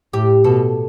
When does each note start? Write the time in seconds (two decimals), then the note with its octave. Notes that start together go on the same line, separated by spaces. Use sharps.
0.13 A2 G4
0.44 B2 A4